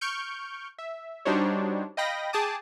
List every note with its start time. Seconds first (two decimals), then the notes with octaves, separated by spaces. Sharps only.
0.01 C#6 F6 G6 D7
0.78 E5
1.25 G3 D4 D#4 F#4 C5 C#5
1.97 D#5 F5 G5 B5 A#6
2.33 G#4 G5 A5 D6 D#6